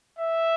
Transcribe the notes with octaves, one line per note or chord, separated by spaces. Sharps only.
E5